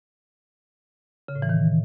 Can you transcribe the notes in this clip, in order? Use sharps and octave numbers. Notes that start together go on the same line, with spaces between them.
C#3
A2
E3
D#3